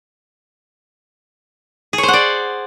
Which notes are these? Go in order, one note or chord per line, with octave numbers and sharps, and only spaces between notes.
G#4
C#5
C5
F#5
D5